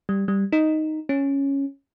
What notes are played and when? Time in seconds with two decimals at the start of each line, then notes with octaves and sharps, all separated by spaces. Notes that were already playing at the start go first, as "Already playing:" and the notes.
0.09 G3
0.28 G3
0.52 D#4
1.09 C#4